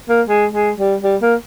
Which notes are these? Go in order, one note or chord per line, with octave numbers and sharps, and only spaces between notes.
A#3
G#3
G#3
G3
G3
A#3